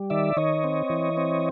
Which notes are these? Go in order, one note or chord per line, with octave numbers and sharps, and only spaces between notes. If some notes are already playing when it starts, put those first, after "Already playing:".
Already playing: G3
D#3 D5 E5
D#3 C#5 D#5
C4
E3
C4